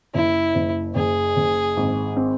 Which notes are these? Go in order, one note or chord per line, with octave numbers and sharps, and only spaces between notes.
F#1 E4
F#1
F#1 G#4
F#1
G#1
C4